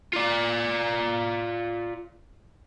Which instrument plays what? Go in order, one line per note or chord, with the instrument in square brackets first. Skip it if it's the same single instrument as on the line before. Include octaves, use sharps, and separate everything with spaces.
[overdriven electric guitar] F4 D5